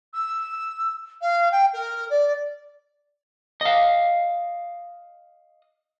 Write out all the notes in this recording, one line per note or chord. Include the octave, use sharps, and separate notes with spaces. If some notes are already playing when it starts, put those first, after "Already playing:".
E6
F5
G5
A#4
D5
D#5 F5